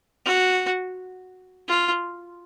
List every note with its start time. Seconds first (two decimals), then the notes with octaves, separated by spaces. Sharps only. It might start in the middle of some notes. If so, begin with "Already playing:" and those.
0.25 F#4
1.68 F4